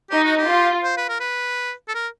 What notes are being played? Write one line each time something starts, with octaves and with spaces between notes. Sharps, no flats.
D#4 G4
F#4
G4
F4
C5
B4
A#4
B4
A4
A#4